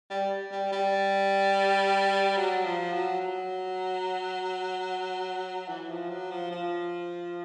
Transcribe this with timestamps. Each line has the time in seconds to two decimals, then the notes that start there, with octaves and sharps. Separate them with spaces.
0.10 G3
0.52 G3
0.72 G3
2.37 F#3
2.65 F3
2.93 F#3
3.21 F#3
5.68 E3
5.90 F3
6.10 F#3
6.31 F3
6.51 F3